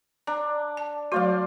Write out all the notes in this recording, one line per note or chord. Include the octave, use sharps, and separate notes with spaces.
D4 A#5
A5
F#3 A3 F#4 C5 D5 F5